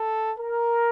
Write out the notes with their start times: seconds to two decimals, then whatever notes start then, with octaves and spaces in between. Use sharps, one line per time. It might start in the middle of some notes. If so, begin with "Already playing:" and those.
Already playing: A4
0.38 A#4